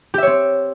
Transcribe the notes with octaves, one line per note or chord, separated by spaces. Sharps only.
C4 G4 C#5 E5